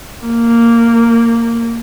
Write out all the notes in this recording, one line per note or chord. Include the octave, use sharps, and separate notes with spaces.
A#3